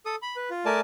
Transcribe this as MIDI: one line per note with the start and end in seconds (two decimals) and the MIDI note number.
0.06 0.16 69
0.06 0.16 87
0.22 0.36 83
0.36 0.49 71
0.50 0.65 65
0.66 0.81 57
0.66 0.81 70
0.66 0.81 74
0.66 0.81 80
0.66 0.81 81